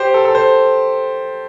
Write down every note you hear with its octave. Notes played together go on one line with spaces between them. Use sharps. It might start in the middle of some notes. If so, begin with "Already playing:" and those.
Already playing: G4 C5
A4
A4
C5